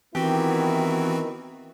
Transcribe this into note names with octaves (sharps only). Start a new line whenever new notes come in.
D#3 E3 B3 C4 E4 F#4 G4